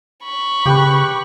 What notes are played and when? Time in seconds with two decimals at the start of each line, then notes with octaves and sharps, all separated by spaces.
0.24 B5 C#6
0.66 C#3 G4 B4